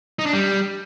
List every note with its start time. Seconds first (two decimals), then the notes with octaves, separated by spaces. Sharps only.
0.19 D#4
0.26 D4
0.33 G3